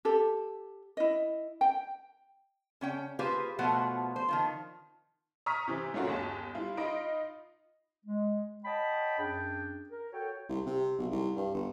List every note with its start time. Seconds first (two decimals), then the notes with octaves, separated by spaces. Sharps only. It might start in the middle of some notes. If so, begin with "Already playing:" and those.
0.05 G4 A4
0.97 E4 D#5
1.61 G5
2.81 C#3 C#4 G5
3.19 A#3 F4 G4 G#4 B4 C5
3.59 B2 F3 A3 F4 C5 F#5
4.16 C5
4.28 D#3 F3 F4
5.46 A#5 C#6 D#6 F6 B6
5.67 C3 E3 C4
5.94 A3 C#4 F4 F#4 A#4
6.07 G1 D#2 G#4 A5
6.55 G3 E4 F4
6.77 D#4 F4 D#5 B5 D7
8.05 G#3
8.65 C#5 D#5 F#5 G5 A5 B5
9.19 F#2 D4 G#4 G5
9.90 A#4
10.12 F#4 A4 C#5 G5
10.49 C2
10.66 C3
10.99 B1
11.11 C2
11.36 G2
11.54 G1